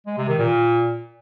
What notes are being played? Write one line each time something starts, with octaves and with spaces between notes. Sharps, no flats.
G#3
C3
D#3
A#2